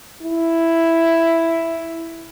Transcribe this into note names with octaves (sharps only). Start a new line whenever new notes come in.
E4